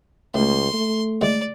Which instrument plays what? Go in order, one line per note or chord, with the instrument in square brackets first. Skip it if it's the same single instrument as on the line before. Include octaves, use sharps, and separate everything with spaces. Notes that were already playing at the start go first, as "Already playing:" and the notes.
[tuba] C#2 [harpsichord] A2 [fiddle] C6
[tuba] A3
[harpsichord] A2 D3 G#3 [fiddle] D5